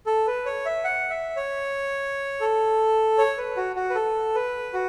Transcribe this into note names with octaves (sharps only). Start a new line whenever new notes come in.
A4
B4
C#5
E5
F#5
E5
C#5
A4
C#5
B4
F#4
F#4
B4
A4
B4
F#4